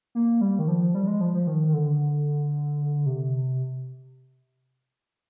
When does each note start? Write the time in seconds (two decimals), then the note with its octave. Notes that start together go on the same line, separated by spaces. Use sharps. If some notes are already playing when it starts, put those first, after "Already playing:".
0.15 A#3
0.41 G3
0.59 D#3
0.68 F3
0.95 G3
1.07 G#3
1.21 F3
1.34 F3
1.47 D#3
1.68 D#3
1.73 D3
3.06 C3